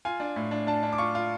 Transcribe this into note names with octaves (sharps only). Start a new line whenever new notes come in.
F4 G#5
D4
A2
D4
D4 A5
D4
D6
F4 C#6
F4